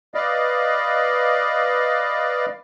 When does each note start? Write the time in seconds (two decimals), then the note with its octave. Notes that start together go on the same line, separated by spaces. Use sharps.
0.14 B4 D5 D#5 F5